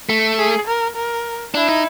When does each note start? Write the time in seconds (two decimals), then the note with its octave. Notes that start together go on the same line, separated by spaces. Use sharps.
0.09 A3
0.39 G#4
0.67 A#4
0.96 A#4
1.54 D4 E4
1.69 D#4